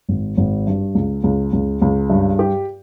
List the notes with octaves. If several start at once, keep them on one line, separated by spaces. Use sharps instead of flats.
G#1
G#1
G2
C#2
C#2
C#2
C#2
G2
G4